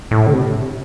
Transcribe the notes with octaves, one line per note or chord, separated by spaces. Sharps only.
A2
D3
C3